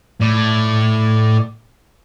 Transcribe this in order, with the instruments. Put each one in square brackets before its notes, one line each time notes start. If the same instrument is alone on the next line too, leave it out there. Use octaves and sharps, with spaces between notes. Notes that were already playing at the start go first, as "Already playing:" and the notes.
[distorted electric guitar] A2 [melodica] D5